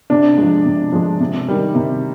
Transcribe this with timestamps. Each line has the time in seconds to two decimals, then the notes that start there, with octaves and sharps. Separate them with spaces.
0.10 C3 D4
0.38 F3 G#3
0.65 C3
0.92 F3 G#3
1.20 C3
1.48 D#3 G3
1.75 C3